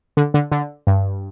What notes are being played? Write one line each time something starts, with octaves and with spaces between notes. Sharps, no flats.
D3
D3
D3
G2